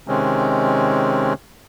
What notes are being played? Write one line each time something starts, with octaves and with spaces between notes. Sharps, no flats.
C3 D#3 G#3 C4 C#4